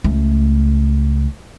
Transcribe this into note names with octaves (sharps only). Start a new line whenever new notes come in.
C#2 A3